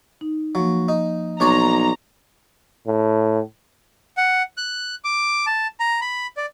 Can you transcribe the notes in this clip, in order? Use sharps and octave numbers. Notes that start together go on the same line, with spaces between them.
D#4
F3 F#3 A#3
D#4
B1 D4 C#5 D5 A#5
A2
F#5
F#6
D6
A5
A#5
B5
D5